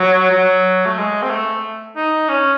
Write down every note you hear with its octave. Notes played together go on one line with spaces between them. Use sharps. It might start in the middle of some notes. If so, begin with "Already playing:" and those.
Already playing: F#3
F#3
A3
G#3
C4
A3
D#4
C#4